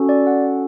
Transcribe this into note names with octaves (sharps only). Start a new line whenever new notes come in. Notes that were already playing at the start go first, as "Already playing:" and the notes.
Already playing: C#4 F#4 A4
D5
F#5